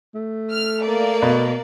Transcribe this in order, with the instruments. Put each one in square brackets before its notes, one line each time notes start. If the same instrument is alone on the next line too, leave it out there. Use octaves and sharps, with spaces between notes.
[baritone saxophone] A3
[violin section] F6
A#3 D5
[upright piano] B2